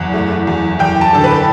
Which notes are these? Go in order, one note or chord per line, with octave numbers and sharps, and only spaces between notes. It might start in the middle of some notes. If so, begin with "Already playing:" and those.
Already playing: F#1 E2 F#5
A3
E2
E2 G5
A5
D3 A4
B4